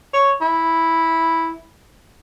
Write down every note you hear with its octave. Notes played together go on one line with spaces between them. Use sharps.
C#5
E4